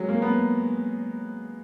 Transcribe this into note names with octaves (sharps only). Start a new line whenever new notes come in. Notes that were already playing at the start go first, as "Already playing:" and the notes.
Already playing: F#3 G#3
A#3
B3